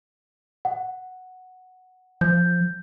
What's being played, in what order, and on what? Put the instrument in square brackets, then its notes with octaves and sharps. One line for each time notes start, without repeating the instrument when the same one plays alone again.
[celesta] F#5
[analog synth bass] F3 [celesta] G6